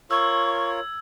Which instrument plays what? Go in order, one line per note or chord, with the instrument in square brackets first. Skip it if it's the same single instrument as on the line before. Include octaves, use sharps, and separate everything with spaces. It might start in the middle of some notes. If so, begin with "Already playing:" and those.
[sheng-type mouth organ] F4 A#4 C#5 [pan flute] C#6 [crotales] E6 G#6